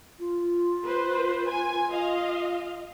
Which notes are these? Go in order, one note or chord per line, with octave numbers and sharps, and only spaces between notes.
F4
B4 C5
G#5
D#5 F5